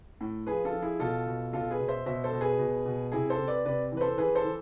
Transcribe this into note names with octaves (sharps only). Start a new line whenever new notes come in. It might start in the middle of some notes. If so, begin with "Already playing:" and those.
A2
F3 G#4 B4
F4 A4
F3
E4 G#4
B2 F4 A4
B2
B2 F4 A4
G#4 B4
B2
C5 E5
B2 C5 E5
A4 C5
B2
G#4 B4
B2
B2
C3 E4 G#4
A4 C5
C3
B4 D5
C3 B4 D5
E3
B4
A4 C5
E3 G#4 B4
A4 C5
E3